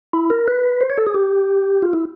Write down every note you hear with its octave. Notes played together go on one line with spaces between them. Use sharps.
E4
A#4
B4
C5
C#5
A4
G#4
G4
F4
E4